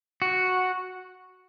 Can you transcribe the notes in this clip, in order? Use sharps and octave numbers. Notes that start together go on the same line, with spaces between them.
F#4